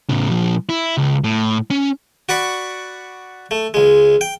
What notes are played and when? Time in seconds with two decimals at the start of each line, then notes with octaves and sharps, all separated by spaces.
0.09 A2 C#3
0.31 A#2 F3
0.69 E4
0.97 C#2
1.24 A2
1.70 C#4
2.29 F#4 D5 B5 C#6
3.51 A3
3.74 C#2 G#3
4.21 G5